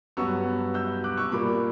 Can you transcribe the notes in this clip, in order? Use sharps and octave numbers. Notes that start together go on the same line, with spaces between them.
G2 F#3 B3 C#6 E6
E6 G6
D6 F#6
C#6 E6
A#2 G3 A#3 B5 D6